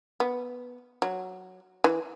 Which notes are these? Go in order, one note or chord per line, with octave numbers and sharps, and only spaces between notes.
B3
F#3
E3